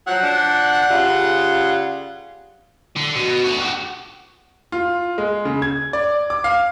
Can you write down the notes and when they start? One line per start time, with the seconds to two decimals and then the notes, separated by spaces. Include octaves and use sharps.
0.07 F3 F#3 F#5
0.22 F3 D4
0.89 C#3 G3 F4
2.96 D3
3.15 B2
3.44 A3 F#4
3.60 F#4 G4
4.72 F4
5.18 G#3
5.45 C#3
5.62 G#6
5.93 D5
6.30 D6
6.44 F5